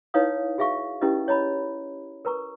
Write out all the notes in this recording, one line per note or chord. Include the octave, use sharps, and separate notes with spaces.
D#4 E4 B4 C#5 F5 D#6
F#4 G#4 E5 F5 C#6
C#4 E4 G4 A4 B4 D#5
C#5 D#5 A#5 B5
A#4 B4 A#5 C#6